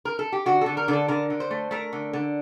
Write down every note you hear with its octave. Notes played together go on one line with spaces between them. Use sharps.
A#4
A4
G4
D3 F#4
D3 A4
A#4
D3
A4
D3 A#4
D3
C5
A3
A3 A#4
D3
D3